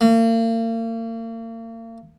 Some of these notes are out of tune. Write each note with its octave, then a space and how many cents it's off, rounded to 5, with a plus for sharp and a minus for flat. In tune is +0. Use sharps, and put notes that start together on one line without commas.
A#3 -40